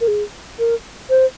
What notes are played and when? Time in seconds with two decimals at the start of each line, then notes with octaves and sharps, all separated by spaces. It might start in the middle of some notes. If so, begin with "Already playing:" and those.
0.01 A#4
0.08 G#4
0.59 A#4
1.10 C5